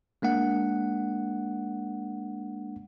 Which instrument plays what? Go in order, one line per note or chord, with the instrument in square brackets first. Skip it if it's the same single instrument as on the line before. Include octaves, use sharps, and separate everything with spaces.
[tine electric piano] G#3 A#3 D4 F#5